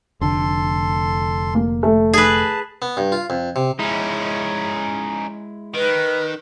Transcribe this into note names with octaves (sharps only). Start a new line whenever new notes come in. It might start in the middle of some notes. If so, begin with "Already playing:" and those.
F1 D3 A4 C6
A#3
A3
G#4 B4 A5
B3
G2
F4
F2
C3
G#3 C#4 D#4 E4
D#3 B4